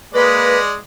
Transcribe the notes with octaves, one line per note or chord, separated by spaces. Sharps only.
G#3 A#3 B4 D5 D#5